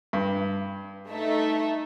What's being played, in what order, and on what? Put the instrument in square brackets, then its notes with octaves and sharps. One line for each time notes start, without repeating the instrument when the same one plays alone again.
[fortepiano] G2
[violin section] A3 D#4 E5